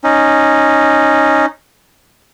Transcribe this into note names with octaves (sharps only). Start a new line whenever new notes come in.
C#4 D#4